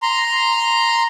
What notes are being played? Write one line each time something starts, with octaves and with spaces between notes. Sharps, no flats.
A#5 C6